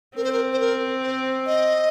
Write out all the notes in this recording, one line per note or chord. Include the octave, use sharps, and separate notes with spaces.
C4 A#4
C5
A#4
C5
A#4
C5
D#5